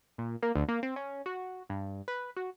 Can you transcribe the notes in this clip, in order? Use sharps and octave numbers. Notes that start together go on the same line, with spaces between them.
A#2
A#3
D2
A#3
C4
C#4
F#4
G2
B4
F#4